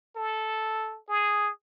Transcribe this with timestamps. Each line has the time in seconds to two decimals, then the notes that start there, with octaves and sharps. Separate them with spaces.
0.16 A4
1.09 G#4